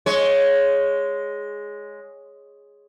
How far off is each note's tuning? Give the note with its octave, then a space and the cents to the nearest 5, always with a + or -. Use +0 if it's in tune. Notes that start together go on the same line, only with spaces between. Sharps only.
G#3 +0 C#5 +0